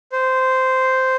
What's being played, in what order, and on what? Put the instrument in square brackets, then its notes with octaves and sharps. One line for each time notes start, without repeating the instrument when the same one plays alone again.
[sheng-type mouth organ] C5